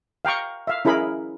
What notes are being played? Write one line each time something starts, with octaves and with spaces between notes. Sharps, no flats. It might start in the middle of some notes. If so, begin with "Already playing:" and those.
F5 G5 A#5 C#6
E5 F5
C#4 E4 G#4 A#4 B5